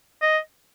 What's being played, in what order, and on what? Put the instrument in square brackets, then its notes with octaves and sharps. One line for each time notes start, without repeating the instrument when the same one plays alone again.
[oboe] D#5